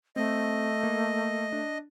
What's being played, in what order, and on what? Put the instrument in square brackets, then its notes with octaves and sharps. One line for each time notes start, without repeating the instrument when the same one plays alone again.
[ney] A3 [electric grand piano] C4 [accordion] D#5
[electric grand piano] A#3
D4